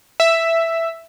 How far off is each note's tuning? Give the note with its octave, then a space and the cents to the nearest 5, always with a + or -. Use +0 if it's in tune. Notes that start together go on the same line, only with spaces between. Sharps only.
E5 +5